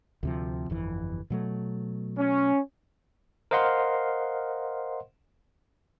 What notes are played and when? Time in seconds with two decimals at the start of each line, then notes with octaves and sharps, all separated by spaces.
0.23 D2 C3 F3
0.70 G1 F2 E3
1.30 B2 F#3 A3
2.18 C#4
3.51 A#4 C5 D#5 F5 F#5 C6